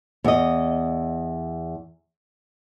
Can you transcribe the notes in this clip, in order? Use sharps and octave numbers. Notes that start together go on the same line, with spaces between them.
E2 D#5